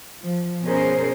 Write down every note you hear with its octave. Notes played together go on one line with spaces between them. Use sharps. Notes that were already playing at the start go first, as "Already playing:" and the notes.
F3
B2 C#4 G#4 A#4 C5